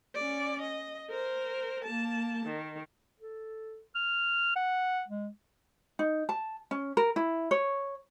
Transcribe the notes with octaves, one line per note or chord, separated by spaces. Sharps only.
C#4 D5
D#5
A#4 C5
A#3 A5
D#3
A4
F6
F#5
G#3
D#4
A5
C#4
A#4
E4
C#5